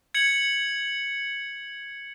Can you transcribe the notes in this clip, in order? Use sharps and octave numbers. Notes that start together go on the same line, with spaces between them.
G#6 C#7 F#7